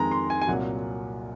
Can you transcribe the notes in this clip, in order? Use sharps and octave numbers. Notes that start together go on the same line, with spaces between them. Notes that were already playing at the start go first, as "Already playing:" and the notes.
Already playing: F2 D#3 G#3 A#5
C6
G#5
G#5
C2 A#2 F#3 F#5